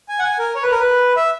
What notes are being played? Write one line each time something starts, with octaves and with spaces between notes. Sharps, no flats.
G#5
F#5
G#5
A#4
C#5
B4
A#4
B4
E5